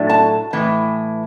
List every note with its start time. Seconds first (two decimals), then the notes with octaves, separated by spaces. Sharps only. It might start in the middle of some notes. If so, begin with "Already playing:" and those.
Already playing: A2 F#3 A3 D4
0.09 A5
0.53 A2 E3